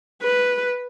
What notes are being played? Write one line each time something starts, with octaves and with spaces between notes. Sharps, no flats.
B4